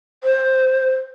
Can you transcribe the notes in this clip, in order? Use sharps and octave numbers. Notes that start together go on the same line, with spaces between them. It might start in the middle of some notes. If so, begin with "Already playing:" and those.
C5